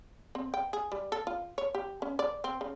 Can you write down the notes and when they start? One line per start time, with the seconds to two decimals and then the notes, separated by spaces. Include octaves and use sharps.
0.35 C4
0.54 G5
0.73 G#4
0.92 G3
1.12 A4
1.27 F4
1.58 C#5
1.74 G4
2.02 C#4
2.19 D5
2.44 C4
2.61 C#3